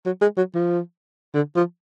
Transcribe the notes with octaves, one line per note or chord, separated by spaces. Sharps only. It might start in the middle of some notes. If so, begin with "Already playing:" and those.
F#3
G#3
F#3
F3
D3
F3